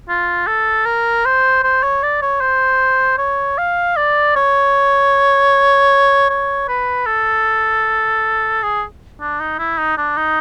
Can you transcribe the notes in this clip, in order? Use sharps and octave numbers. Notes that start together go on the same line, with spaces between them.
F4
A4
A#4
C5
C5
C#5
D5
C#5
C5
C#5
F5
D5
C#5
C#5
B4
A4
G#4
D4
D#4
E4
D#4
D4
D#4